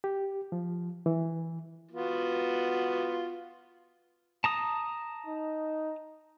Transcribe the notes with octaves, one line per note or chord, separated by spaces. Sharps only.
G4
F3
E3
B3 F4 F#4
A5 A#5 D#6
D#4